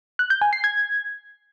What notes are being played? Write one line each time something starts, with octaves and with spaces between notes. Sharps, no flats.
F#6
G6
G#5
C7
G#6